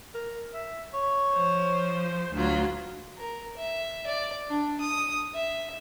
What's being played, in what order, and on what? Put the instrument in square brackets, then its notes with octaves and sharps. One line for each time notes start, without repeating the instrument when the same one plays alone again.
[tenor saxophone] A#4
E5
C#5
[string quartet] F3 C5
[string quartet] D2 F#3 F4 [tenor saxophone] D3
[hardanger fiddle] A#4
E5
D5
D4
D#6
E5